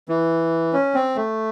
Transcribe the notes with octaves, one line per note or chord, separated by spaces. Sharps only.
E3
C#4
C4
A3